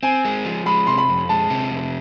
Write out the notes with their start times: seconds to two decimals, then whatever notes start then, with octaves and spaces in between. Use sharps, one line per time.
0.03 C4 G#5
0.25 G#3
0.45 F3
0.66 G#3 B5
0.87 C3 C6
0.98 B5
1.09 F2
1.29 G#3 A5
1.50 C3
1.71 F2